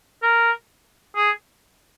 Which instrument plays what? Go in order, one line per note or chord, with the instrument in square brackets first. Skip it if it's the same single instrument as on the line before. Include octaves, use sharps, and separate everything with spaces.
[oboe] A#4
G#4